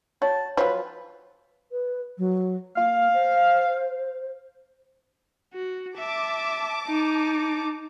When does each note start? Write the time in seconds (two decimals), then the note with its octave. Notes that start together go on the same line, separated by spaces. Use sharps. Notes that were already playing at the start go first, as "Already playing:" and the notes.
0.22 F#4 C#5 A5
0.57 F3 F#3 B4 C#5
1.72 B4
2.18 F#3
2.76 A#3 F5
3.13 C5
5.54 F#4
5.97 E5 A5 D6
6.87 D#4